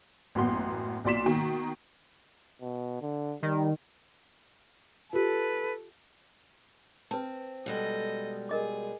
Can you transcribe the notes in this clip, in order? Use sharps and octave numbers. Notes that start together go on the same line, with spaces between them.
A1 F#2 A#3 B3 C6
B1 A#2 D5 C6 B6 E7
B2 D#3 A#3
B2
D3
D#3 G3
F4 G4 A4 B4
C4 B4 A5
B2 G3 G#3 A4 D#5
G#4 A#4 D#5 D6